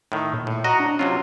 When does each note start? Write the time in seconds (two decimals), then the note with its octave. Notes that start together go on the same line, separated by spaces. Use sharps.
0.12 A2 D#3
0.33 A#2
0.47 A2
0.64 F#4 D#5 F#5 A#5
0.80 D4
0.99 C3 F#3 C#4 F4